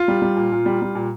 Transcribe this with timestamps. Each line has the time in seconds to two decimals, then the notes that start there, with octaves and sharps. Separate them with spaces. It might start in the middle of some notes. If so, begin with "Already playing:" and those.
Already playing: F4
0.08 G3
0.22 G3
0.37 A#2
0.52 A#2
0.66 G3
0.82 G3
0.95 A#2